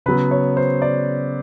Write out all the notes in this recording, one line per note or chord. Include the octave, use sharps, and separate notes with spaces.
C#3 F#3 B3 B4
C#5
C5
D5